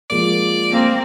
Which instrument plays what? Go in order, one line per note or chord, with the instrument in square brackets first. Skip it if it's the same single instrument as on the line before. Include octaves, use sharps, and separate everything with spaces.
[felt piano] F3 G#3 A#3 [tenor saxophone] D5
[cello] A#3 C4